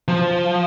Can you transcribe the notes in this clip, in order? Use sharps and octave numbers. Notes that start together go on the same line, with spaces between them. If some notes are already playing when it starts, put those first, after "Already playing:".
F3